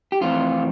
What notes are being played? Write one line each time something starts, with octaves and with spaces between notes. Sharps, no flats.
G4
F2 E3 A3 C4 F4